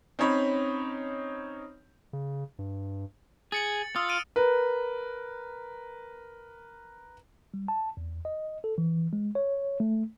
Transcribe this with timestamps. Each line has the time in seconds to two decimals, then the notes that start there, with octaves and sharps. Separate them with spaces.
0.19 C4 C#4 D#4 C#5 B5
2.13 C#3
2.59 G2
3.52 G#4 A6 C#7 F#7
3.96 F4 D#6 E6
4.09 F6 D7 D#7
4.36 A#4 B4
7.54 G3
7.68 A5
7.97 E2
8.25 D#5
8.64 A4
8.78 E3
9.13 G#3
9.35 C#5
9.80 A3